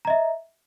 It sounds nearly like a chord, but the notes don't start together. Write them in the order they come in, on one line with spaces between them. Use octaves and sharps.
A#5 D#5 E5